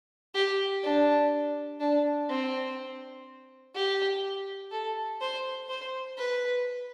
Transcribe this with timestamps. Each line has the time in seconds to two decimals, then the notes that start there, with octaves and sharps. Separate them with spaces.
0.34 G4
0.83 D4
1.80 D4
2.29 C4
3.74 G4
4.71 A4
5.21 C5
5.69 C5
6.17 B4